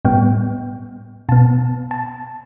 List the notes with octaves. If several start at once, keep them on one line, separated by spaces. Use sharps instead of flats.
A2 G3 B3 G5
B2 B3 A5
A5